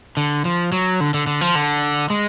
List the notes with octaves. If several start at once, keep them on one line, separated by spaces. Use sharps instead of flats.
D3
F3
F#3
D3
D3
D3
F3
D3
G#3